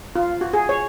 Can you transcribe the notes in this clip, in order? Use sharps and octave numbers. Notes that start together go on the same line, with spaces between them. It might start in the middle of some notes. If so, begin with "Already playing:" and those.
F4
F#4
G#4
C#5